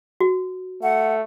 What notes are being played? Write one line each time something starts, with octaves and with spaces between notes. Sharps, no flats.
F#4
A3 F#5